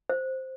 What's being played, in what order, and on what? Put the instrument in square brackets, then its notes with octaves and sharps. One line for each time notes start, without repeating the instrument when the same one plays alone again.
[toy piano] C5